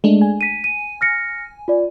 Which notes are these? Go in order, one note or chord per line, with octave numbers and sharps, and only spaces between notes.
G#3 A3 D4
G#5
B6 D#7
D#7
F6 A#6 C#7
F4 D5